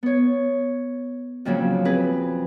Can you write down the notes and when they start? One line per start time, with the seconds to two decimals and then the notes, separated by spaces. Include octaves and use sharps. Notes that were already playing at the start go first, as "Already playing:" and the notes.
0.03 B3 C#5
1.45 F2 A#2 C#3 F#3
1.85 C4 G#4 B4